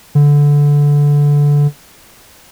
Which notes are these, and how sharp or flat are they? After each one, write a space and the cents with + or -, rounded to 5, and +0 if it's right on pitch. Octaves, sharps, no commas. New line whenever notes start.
D3 -15